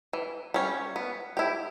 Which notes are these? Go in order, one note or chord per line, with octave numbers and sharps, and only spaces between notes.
E3
G3 C#4
B3
E4 G4